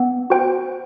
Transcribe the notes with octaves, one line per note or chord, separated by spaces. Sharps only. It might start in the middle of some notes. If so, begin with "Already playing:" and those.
Already playing: B3
F#4 C5 G5